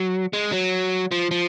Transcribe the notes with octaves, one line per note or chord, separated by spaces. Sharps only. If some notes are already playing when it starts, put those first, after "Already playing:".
Already playing: F#3
G#3
F#3
F3
F3